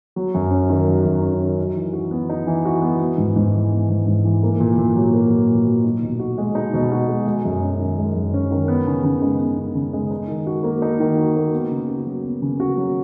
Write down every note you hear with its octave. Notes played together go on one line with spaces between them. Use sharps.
F#3
F#2
C#4
D#3
F#3
F#2
C#4
D#3
D#4
E3
F#4
B3
D#4
E3
F#4
B3
B3
G#2
G#2
E3
B3
G#2
G#2
E3
A#3
A#2
A#2
F#3
A#3
A#2
A#2
F#3
D#4
B2
F#4
G#3
D#4
B2
F#4
G#3
G#3
F#2
C#4
D#3
G#3
F#2
C#4
D#3
B3
C#3
C#3
G#3
B3
C#3
C#3
G#3
D#4
D#3
F#4
A#3
D#4
D#3
F#4
A#3
B3
C#3
F#4
F#3
B3
C#3
F#4
F#3